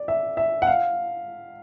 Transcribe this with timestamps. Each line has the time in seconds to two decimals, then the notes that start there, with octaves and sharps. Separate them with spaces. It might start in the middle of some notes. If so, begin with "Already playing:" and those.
Already playing: D5
0.08 E5
0.37 E5
0.62 F#5
0.67 F5